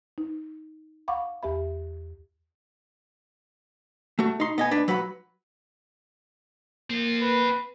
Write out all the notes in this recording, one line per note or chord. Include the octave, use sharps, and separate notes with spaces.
D#4
F5 F#5 B5 C#6 D6
E2 G4 E5 B5
A3 F#4
D#4 C6
B3 D#5 G#5
D4 B4
F#3 B4 F#5 B5
A#3 C4 F4
B4